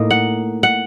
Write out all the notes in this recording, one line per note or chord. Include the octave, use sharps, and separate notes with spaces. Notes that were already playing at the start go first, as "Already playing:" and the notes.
Already playing: A2 A#3 D#4
F#5
F#5